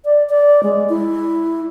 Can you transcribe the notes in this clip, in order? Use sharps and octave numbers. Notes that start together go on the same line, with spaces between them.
D5
D5
G#3
E4